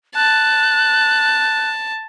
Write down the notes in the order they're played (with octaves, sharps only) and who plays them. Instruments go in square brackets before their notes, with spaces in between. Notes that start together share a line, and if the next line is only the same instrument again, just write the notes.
[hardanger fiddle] A5 [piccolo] F#6